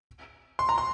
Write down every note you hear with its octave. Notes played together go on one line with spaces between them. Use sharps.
C6
A#5
C6